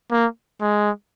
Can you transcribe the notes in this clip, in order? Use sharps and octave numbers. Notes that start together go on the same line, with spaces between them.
A#3
G#3